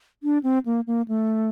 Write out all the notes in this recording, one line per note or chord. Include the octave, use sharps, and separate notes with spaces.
D4
C4
A#3
A#3
A3